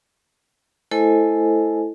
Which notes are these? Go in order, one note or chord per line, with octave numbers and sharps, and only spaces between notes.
A3 E4 A4 C5 D#5 G#5